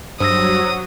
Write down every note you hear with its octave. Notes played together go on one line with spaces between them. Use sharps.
G2 F#3 C5 D#6 E6 A#6